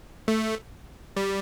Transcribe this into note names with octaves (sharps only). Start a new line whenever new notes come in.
A3
G3